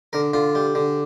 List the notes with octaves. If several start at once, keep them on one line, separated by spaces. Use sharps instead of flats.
D3 A#4
D3 F4
G3
D3